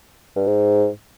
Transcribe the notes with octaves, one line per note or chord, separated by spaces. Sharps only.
G2
G#2